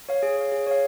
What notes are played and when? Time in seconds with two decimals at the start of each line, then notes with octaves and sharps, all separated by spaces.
0.09 C#5 F5
0.23 G#4
0.37 C#5 F5
0.52 G#4
0.67 C#5 F5